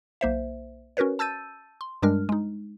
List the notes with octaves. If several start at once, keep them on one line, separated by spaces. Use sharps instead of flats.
B1 A#3 C5 E5
C#4 F#4 A#4 B4 C#5
A5 E6 G6 A6 D#7
C6
G2 G3 G#3 D4 A#4 F6
G#3 D#4